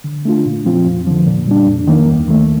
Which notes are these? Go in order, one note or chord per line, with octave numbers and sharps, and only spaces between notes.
D3
A3 D4 F4
A#2
F3 C4 F4
F2
D3 F3
A#2
G3 D4
F2
D#3 A#3
D#2
D#3 A3